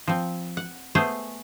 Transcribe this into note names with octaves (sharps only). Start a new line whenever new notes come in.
F3 C4
F#5
A3 B3 G#4 C5